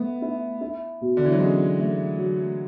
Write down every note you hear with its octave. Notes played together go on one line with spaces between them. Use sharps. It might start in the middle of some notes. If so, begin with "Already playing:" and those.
Already playing: A3 B3
E4
E4
B2
D3
E3
F#3
G#3 C#4
A3
F#3